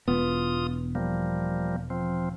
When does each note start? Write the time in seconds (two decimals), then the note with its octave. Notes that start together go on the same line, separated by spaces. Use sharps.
0.08 E1 B3 F4 D#6
0.95 F3 G3 A#3
1.90 F3 C4